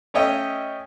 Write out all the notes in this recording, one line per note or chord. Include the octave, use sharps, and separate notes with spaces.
A3 C#4 C#5 D#5 E5 G5